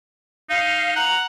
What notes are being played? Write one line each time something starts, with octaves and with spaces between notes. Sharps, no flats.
D#4 F5
F#5 A#5